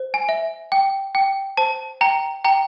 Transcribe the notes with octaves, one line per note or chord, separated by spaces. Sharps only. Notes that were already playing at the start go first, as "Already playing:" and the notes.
Already playing: C5
G#5
E5
G5
G5
C5 A5
G5 A#5
G5 A#5